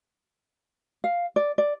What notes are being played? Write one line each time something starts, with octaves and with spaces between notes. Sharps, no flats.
F5
D5
D5